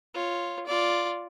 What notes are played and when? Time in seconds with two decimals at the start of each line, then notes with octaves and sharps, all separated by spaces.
0.14 F4 C#5
0.66 F4 D5